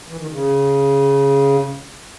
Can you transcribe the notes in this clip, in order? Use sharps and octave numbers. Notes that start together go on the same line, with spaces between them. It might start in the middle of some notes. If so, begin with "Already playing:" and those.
E3
D#3
C#3